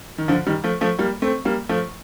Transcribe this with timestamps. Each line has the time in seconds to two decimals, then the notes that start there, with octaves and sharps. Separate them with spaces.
0.18 D#3
0.28 D3 F3
0.47 D#3 G3
0.64 F3 A3
0.81 F3 A3
0.99 G3 A#3
1.22 A3 C4
1.45 G3 A#3
1.69 F3 A3